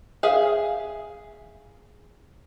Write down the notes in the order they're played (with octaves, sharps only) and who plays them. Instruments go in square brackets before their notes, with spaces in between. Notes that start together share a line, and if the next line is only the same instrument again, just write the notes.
[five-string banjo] G#4 E5 F5